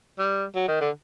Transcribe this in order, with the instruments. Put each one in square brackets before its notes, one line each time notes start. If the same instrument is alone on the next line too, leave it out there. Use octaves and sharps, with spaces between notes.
[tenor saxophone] G3
F#3
D#3
D3